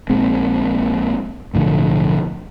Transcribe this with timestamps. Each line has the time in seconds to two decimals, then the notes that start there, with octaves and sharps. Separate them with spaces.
0.10 A#1 A#2 G#3 C4
1.54 B1 A2 D3 F3